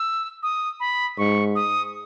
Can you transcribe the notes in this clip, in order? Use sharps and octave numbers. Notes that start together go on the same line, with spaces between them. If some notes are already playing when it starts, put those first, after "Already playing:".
Already playing: E6
D#6
B5
G#2 C#6
D#6